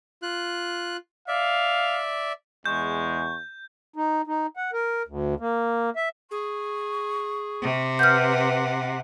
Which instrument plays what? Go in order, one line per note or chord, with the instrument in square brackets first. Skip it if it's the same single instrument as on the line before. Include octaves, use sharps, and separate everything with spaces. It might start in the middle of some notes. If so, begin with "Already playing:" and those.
[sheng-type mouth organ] F4 F#6
[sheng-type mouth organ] D5 E5 [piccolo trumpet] F5
[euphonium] E2 [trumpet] G#3 [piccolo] C#6 [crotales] G6
[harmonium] D#4
D#4
F#5
A#4
D2
A#3
E5
[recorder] G#4 [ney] C#6
[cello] C3
[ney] B4 [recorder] F#5 [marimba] F6 G6